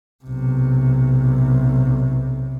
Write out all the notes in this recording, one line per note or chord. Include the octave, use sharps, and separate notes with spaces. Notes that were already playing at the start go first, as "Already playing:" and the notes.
B1 C3